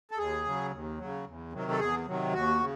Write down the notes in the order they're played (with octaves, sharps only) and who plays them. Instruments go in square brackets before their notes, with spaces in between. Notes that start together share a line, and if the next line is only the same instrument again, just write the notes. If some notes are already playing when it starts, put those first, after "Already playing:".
[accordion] A4
D#2 G#4
C#3 F#3
D#2
C#3 F#3
E2
C3 D#3 F#3
A4
E2 G#4
C3 D#3 F#3
D#2 F#4
C#3